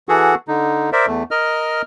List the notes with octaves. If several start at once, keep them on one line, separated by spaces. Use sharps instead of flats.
E3 F#4 G#4 A4 F#5
D3 D#4
A#4 C5 D5 E5
E2 A3
A#4 D#5 F6